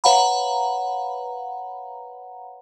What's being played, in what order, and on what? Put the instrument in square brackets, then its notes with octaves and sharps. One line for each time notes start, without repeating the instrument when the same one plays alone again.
[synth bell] B4 C#5 F5 F#5 A#5 B5